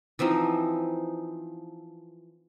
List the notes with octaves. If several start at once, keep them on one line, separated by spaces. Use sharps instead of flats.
E3 F3 C4 D#4